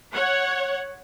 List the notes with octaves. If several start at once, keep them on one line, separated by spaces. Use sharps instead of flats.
C#5 F#5